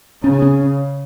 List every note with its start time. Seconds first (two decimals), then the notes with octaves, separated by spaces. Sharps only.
0.24 C#3 C#4
0.42 C#4